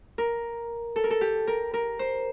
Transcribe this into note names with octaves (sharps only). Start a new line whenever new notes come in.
A#4
A4
A#4
A4
G4
A#4
A#4
C5